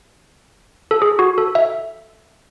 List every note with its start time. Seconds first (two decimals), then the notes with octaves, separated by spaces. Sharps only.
0.91 A4
1.02 G#4
1.19 F#4
1.38 A4
1.55 E5